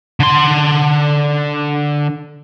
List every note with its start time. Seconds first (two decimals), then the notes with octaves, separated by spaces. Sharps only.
0.20 D3 C6